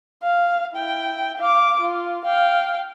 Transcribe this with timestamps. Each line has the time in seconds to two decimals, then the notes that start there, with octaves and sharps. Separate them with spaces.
0.23 F5
0.73 E4 G5
1.38 F5 D6
1.80 F4
2.25 F5 G5